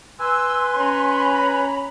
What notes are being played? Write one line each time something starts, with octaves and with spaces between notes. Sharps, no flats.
B4 G#5 C6 E6
C#4 A#5 B5